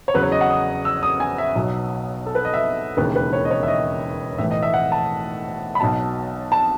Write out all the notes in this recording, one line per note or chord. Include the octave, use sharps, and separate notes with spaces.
C#5
E2 C#3 F#3 B4
C#5
D#5
F#5
D#6
E6
D#6
G#5
E5
B1 B2 F#3
A4
B4
D#5
E5
E1 D#2 C#3 E3 B4
B4
C#5
D#5
C#5
E5
D#5
B1 A2 E3 E5
D#5
E5
F#5
A5
B5
B1 B2 F#3 A5
A5